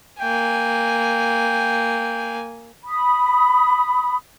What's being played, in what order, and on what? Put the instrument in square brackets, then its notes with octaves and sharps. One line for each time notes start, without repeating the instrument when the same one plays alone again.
[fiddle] A#3 G#5 [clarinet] G5
[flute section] B5 D#6